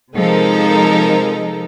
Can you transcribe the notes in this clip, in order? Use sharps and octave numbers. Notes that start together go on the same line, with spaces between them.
C3 F3 G#3 D#4 A4 A#4